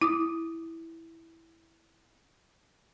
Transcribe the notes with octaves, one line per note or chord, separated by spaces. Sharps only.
E4 D6 D#6